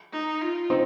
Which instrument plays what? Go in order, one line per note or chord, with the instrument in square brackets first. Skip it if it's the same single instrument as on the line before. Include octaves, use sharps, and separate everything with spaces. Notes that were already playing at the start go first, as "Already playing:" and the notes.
[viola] D#4
F4
[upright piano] C4 D#4